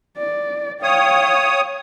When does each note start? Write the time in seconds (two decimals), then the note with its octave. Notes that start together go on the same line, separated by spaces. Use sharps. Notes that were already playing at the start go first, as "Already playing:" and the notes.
0.18 D5
0.83 C#5 F5 G5 D#6